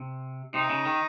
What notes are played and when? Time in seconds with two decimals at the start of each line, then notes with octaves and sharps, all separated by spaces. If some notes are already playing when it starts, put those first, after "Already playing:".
Already playing: C3
0.54 C3 D#4
0.70 C#3
0.85 D#3